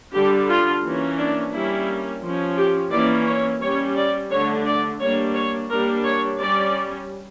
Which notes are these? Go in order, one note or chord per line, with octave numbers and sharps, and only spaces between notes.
D3 G3 D4 G4
F4
E3 A#3 C#4
D4
G3 A#3 C#4 E4
F3 C#4
G4
E3 A#3 C#4 D5
C#5
G3 C#4 C#5
D5
D3 A3 D4 C#5
D5
G3 A#3 D4 C#5
C#5
G3 A#3 D4 A#4
C#5
G3 C#4 D5